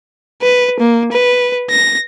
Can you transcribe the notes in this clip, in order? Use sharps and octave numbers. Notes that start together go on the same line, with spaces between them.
B4
A#3
B4
A#6